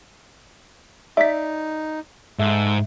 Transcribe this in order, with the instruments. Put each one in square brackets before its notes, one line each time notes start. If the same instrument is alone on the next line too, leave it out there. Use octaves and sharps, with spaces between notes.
[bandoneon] D#4 [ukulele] D5 [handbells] E5 B6
[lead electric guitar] G#2 [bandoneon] A4 [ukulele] E5